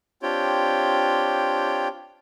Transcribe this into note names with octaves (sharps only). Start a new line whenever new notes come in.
C4 D4 F4 G4 C#5 G5